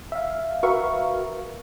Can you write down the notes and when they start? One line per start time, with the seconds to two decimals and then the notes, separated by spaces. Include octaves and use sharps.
0.12 E5 F5
0.63 F#4 A#4 B4 E5 F5 C#6